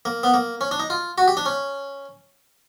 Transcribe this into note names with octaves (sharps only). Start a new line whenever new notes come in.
A#3
B3
A#3
C#4
D4
D#4
F4
F#4
G4
D4
C#4